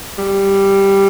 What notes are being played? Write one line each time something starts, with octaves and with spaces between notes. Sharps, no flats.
G3